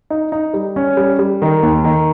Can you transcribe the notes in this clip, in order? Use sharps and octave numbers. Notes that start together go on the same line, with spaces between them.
D#4
D#4
G3
C#4
G3
G3
D#3
D#2
D#3